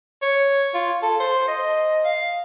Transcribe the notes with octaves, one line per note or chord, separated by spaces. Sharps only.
C#5
F4
A4
C5
D#5
F5